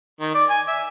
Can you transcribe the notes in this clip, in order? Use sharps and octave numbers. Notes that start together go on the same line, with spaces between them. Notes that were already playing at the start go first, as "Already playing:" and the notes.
D#3
D5
G#5
E5